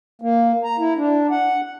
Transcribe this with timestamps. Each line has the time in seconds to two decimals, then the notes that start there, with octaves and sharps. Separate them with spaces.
0.22 A#3
0.64 A#5
0.79 E4
0.97 D4
1.31 F#5